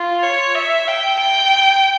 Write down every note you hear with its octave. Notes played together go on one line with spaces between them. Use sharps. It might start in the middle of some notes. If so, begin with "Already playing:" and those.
Already playing: F4
C#5
E5
G5
G5